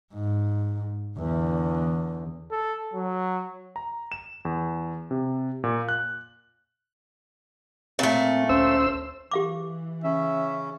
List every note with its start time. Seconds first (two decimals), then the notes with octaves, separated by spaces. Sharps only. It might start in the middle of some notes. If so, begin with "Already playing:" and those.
0.13 G#2
1.18 E2 D3
2.51 A4
2.94 F#3
3.76 A#5
4.12 E7
4.45 E2
5.11 C3
5.64 A#2
5.89 F#6
7.99 A#2 A3 C4
8.49 D2 C#4 C5 E6
9.31 E3 G4 F5 D6
10.04 C#3 C#4 E5